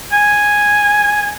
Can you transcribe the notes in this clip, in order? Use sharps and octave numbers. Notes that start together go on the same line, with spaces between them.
G#5